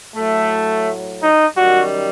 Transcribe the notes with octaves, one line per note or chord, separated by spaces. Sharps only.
A2 F#3 A3
D#4
F#2 D#3 G3 F#4